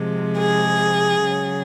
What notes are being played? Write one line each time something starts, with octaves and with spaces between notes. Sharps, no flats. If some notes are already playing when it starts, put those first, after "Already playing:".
Already playing: C3 F3 G#3
G#4
C#3 F#3